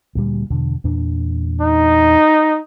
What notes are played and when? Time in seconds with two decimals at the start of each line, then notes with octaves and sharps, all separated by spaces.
0.15 D2 A#2 G3
0.50 E2 B2 D3
0.84 E2 A#2 D4
1.61 D#4